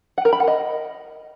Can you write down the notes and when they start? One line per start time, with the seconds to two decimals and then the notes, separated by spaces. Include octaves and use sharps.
0.18 F#5
0.25 A#4
0.33 B5
0.40 F#5
0.47 D#5